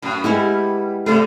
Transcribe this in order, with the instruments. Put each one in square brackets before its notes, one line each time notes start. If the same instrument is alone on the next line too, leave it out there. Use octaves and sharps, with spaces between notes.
[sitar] F#2 A2
[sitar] G3 [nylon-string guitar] G#3 B3 E4
[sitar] C3 E4 [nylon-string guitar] A3 D5